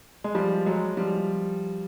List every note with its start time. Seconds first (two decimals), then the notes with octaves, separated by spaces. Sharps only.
0.24 G#3
0.35 F3 G3
0.66 F#3 G#3
0.97 F3 G3